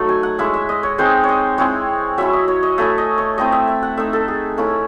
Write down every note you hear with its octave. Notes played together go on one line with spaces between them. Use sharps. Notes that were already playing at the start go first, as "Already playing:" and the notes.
Already playing: F#3 A3 D#4
G#5
F#5
G#3 C#4 E4 E5
E5
D#5
C#5
G#3 C4 D#4 C5
C#5
D#5
G#3 C4 E4 C#5
F#3 C#4 E4 E5
D#5
C#5
D#5
A3 C#4 E4 E5
D#5
C#5
A3 C4 E4 D#5
E5
E5
F#5
A3 D#4 E5
A4
G#4
A3 C#4 E4